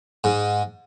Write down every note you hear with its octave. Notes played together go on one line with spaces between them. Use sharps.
G#2